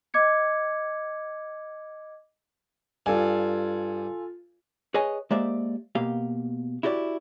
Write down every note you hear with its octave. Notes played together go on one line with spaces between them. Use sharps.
D#5 D6 G#6 C#7
G2 F4 A4 G#5
G#4 B4 C#5 D#5 G#5
G#3 A#3 G4 C5 D5 E5
B2 A#3 G4 F5
E4 F#4 G4 A#4 D5